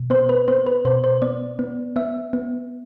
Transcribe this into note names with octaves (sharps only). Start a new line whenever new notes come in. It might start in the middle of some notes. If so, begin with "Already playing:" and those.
Already playing: B2
B3 C5
B4
B3 C5
B4
B2 C5
C5
B3 D5
B3
B3 E5
B3